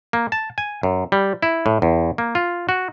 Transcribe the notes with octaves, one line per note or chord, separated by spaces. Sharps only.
A#3
A5
G#5
F#2
G3
E4
A2
E2
A#3
F4
F#4